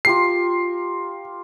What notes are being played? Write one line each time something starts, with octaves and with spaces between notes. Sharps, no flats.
F4 G4 A#4 C7